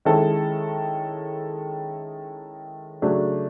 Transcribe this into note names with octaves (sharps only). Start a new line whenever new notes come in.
D#3 G#3 C#4 E4 A4
C#3 F#3 A3 D4